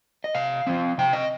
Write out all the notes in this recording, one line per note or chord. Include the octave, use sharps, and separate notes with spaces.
D#5
C3 F5
F3 C4
C3 G5
D#5